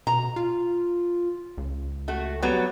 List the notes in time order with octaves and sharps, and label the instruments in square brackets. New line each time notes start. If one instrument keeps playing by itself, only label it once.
[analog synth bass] B2 [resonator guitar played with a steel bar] A#5
[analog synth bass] F4
C#2
[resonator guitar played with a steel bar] A3 F#4
F#3 G3 B3